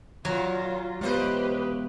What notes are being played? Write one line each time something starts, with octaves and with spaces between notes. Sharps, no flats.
A#2 F#3 F4
G#3 B3 F4 G4 B4 C5 D#5